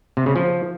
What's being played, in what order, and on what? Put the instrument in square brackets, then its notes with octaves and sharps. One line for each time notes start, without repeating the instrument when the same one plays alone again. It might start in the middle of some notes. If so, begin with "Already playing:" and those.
[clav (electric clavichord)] C3
C#3
F3